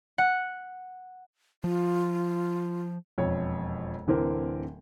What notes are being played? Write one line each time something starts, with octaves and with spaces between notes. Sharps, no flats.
F#5
F3 F4
E1 F2 C#5
D1 D3 E3 C4 A#4